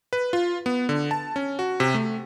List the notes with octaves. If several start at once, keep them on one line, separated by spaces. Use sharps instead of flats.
B4
F4
B3
D3
A5
C#4
F#4
C3
A3